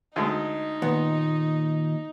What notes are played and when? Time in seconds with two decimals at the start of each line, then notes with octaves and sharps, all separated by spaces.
0.16 D2 G#3 D#4
0.82 D#2 A#2 B3